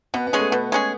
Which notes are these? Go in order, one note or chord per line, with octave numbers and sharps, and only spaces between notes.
B2 B3
B3
G#3 C#4 G#4
A3
B2
G#3 C#4 G#4